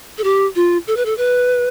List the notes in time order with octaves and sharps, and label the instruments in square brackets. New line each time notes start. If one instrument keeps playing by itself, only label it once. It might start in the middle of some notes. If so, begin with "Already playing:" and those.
[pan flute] A4
G4
F4
A4
B4
A4
B4